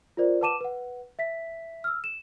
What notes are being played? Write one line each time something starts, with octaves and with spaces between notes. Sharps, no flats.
F4 A#4 C5 D5
B4 F#5 A5 D6 D#7 E7
B4 F#5
E5 B6
E6 F6
E7